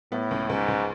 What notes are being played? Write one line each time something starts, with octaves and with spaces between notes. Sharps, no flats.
A2 B3
C#2
C#2 G#2
C#2